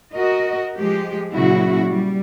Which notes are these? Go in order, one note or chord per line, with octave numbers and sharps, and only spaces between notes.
F#4 A#4 D#5
F3 G#3 G4
A#2 C#3 F#3 E4 F#4
G3